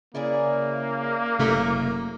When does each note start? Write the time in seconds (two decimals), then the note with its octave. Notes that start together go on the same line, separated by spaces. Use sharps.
0.15 C#3 A#3 E4 G#4 D5
1.39 F#1 C3 A3 A4